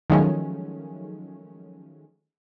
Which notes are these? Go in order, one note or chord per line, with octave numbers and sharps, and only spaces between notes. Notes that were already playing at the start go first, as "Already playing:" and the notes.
D#3 F3 F#3 G#3 A3 C#4